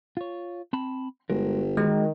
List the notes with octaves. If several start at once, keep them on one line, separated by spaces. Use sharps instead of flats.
F4 C#5
C4 A5 B5
G1 G#3 F#4 A#4
D#3 G#3 F#4